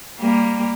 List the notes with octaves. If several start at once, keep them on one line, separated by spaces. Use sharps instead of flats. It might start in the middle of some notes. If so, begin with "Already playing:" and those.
G3 A#3